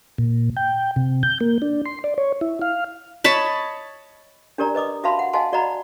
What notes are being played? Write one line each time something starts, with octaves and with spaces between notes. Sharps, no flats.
A#2
G5
C3
G6
A#3
D4
C6
D5
C#5
E4
F5
C#5 D#5 A5 B5
D4 G4 A#4 D5 A#5
B4 D#5 D6 D#6
F#4 E5 F5 A5 B5 C6
F#5
D#5 F5 F#5 G#5 A5 C6
F#4 D5 D#5 F#5 A#5 B5